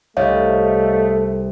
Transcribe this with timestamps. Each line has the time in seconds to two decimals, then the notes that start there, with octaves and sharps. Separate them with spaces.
0.17 C2 A3 C#5 D#5 F5